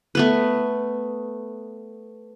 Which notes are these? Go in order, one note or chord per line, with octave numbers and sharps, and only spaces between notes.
A3 B3 B4